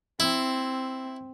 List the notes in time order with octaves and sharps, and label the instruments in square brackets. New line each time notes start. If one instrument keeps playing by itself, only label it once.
[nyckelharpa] C4 [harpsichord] E4